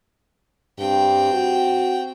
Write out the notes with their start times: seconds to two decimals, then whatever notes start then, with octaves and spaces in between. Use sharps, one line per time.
0.78 G2 C4 G5
1.33 F#4